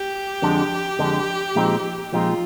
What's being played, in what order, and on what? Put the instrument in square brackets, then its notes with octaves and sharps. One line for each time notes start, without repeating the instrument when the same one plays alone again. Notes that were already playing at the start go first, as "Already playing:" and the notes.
Already playing: [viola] G4
[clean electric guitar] F2 D3 G#3 D4
F2 D3 G#3 D4
A#2 F3 G#3 C4 D#4
[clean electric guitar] A#2 F3 G#3 C4 D#4 [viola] F4